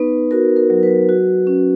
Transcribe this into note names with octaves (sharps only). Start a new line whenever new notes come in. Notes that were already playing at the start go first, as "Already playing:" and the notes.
Already playing: B3 D#4 B4
F#4 A#4
A#4
F#3
B4
F#4
C#4